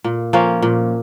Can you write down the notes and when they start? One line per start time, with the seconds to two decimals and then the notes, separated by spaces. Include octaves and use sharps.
0.04 A#2
0.33 F3 A#3 C#4
0.62 A#2